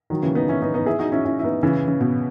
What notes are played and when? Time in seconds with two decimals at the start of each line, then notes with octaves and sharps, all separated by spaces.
0.10 D#3 F#3
0.23 C#3 E3
0.35 B3 D#4
0.49 C#4 E4
0.62 B3 D#4
0.74 B3 D#4
0.86 E4 G#4
0.99 D#4 F#4
1.12 C#4 E4
1.25 C#4 E4
1.39 E4
1.44 B3 D#4
1.63 C#3 E3
1.88 C#3
2.00 B2